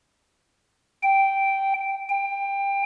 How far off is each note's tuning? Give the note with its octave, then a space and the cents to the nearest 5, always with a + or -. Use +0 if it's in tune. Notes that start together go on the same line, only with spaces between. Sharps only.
G5 -5
G5 +20